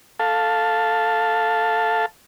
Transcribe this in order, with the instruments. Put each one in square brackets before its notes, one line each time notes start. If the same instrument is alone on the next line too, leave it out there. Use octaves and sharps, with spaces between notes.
[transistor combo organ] A4 F5 A5